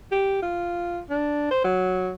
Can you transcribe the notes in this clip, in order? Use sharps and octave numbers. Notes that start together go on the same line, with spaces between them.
G4
F4
D4
C5
F#3